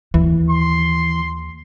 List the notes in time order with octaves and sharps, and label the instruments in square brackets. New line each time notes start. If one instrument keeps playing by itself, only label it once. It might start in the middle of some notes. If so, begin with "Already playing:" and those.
[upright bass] D#2 [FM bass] E3
[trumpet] C6